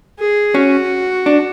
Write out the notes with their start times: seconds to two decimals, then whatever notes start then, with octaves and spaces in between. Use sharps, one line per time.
0.19 G#4
0.54 C#4 F#4
1.26 D4